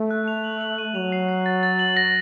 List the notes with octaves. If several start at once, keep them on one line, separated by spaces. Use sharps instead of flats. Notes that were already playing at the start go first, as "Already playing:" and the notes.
Already playing: A3
F#6
F7
F#7
F#7
D#7
F#3 F7
C7
C7
A6
A6
F#7
A#6